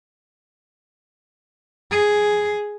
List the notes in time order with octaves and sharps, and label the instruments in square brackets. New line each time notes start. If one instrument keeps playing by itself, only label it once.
[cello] G#4